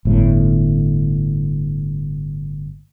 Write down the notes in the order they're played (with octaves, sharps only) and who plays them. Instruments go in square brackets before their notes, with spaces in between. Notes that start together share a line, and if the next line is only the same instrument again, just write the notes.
[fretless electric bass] G1 A2